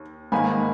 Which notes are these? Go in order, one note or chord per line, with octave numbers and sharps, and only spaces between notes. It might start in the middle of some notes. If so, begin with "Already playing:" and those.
Already playing: D#2
G#2 D#3 A#3 D#4 G#5 B5